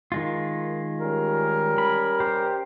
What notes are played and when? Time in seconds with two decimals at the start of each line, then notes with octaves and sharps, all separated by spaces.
0.12 D#3 G#3 F4
1.01 G3 C#4 A#4
1.78 B5
2.20 G4 C5